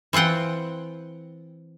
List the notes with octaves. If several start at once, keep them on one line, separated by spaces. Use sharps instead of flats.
E3 C4 F4 F#5 G5